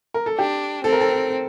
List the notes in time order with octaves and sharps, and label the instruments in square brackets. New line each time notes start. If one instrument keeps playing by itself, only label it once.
[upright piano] A#4
A4
[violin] D4 [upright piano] G4
[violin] C4 [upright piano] A4
[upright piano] A#4
A4